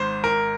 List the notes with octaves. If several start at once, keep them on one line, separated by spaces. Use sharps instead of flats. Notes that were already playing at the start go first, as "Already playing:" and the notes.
Already playing: G#1 G#2 C5
A#4